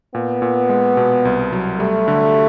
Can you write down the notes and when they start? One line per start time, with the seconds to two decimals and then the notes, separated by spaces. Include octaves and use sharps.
0.15 A#2 B3
0.42 A#2
0.69 G#3
0.97 B2
1.25 C2
1.53 F#3
1.80 G3 A3
2.08 D3